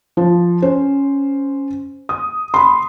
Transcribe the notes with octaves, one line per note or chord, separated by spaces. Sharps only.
F3
C#4 C5
D#6
B5 C6